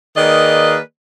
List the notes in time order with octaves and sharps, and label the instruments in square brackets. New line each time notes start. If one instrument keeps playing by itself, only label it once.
[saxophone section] D#3 A#3 G#4 B4 D5 D#5